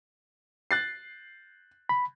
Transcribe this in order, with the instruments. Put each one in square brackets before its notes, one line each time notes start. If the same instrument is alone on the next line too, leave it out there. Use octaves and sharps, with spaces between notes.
[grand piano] F#6 A6 C7
[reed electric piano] B5